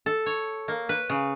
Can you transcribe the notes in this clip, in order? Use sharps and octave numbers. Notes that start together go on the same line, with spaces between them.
A4
C#5
A#3
B4
C#3